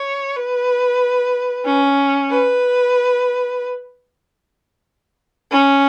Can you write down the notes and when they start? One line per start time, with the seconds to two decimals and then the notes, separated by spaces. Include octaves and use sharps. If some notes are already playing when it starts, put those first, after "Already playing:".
Already playing: C#5
0.36 B4
1.66 C#4
2.30 B4
5.51 C#4